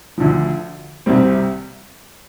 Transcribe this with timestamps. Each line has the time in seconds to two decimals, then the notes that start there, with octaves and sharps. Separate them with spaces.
0.18 D2 D3 F3
1.06 C2 C3 G3 C4